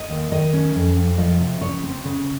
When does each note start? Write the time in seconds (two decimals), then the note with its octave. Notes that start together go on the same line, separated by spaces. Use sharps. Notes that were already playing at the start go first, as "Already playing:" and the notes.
Already playing: D#5
0.09 D#2
0.32 D#3 D#5
0.53 C#4
0.75 F2
0.97 F2
1.18 F3 D#5
1.40 C3
1.61 C#3 C#5
1.84 C4
2.05 C#3